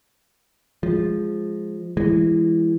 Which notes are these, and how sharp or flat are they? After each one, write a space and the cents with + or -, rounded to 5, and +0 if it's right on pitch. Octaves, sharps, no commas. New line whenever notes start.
F3 +0 G#3 -5
E3 +10 G#3 -20